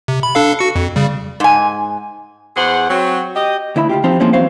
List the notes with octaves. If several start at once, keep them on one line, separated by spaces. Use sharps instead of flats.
C3
B5
D4 A4 F5
F#4 C#7
F2
C#3 G3
G#2 G#5
E2 G#4 C5 F#5
F#3 C4
G4 D#5
D2 E4 E5 B5
D2 F4 G4
F3 C4 D#4 F4 G4
F3 G#3 A#3 C4 C#4 E4
E2 F#3 C4 C5 F5